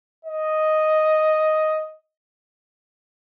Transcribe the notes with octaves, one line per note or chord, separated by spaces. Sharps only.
D#5